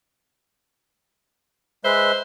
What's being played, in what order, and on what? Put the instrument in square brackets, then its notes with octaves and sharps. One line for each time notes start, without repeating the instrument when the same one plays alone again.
[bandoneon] G#3 B4 E5 [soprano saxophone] C5